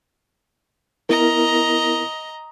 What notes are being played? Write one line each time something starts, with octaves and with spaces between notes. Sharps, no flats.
B3 E4 A#4 D#5 A#5